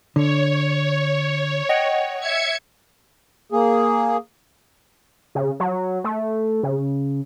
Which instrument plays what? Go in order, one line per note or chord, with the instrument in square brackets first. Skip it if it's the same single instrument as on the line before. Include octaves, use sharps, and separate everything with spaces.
[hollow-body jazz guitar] D3 [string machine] C#5
[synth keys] D#5 F#5 G5
[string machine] E5 G#6 C#7
[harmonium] A#3 G#4
[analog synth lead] C#3
F#3
A3
C#3